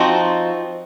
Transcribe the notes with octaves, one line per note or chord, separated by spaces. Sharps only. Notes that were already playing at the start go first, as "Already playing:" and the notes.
Already playing: F3 C4 D#4 F#4